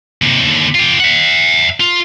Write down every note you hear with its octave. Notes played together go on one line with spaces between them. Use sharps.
D#2 C3
D#2 D3
F4 G4
E5 F#5
F4